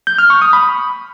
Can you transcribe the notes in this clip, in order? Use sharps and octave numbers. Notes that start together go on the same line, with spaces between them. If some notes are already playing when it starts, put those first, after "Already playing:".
G6
F6
C#6
D#6
B5